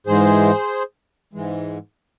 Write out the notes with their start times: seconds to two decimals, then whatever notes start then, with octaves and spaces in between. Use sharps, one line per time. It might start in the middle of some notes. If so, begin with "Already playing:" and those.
0.06 G#2 E3 G#3 G#4 C5
1.33 G#2 E3 G#3